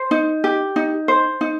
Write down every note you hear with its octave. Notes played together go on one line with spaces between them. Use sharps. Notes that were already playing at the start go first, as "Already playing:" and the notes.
Already playing: C5
D#4
G4
D#4
C5
D#4